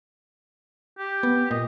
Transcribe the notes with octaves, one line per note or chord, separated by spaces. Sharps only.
G4
B3
A#2 D#5